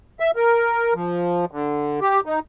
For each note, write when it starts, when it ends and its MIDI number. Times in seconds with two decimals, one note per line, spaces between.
0.20 0.31 76
0.36 0.94 70
0.94 1.45 53
1.51 2.00 50
2.01 2.21 67
2.26 2.39 63